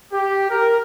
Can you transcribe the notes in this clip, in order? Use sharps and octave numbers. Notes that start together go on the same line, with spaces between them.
G4
A#4